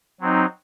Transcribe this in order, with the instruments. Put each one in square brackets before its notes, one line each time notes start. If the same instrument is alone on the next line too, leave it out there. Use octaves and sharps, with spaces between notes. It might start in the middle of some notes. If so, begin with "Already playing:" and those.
[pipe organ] F#3 C4 D#4